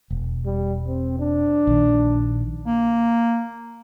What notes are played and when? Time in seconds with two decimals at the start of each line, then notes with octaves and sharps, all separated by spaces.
0.10 E1
0.45 G3
0.87 C4
1.19 D4
1.67 A#1 D#3
2.66 A#3